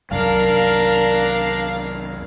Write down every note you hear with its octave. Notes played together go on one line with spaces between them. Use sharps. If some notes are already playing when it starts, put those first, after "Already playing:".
C2 F#2 D4 A#4 F5 F6